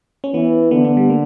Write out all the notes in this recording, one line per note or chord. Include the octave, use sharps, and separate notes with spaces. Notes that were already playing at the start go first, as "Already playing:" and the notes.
C#4
E3 B3
D3 B3
B3
G3
A#3